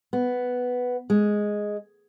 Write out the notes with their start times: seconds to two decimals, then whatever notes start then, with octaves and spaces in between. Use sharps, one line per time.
0.13 B3
1.10 G#3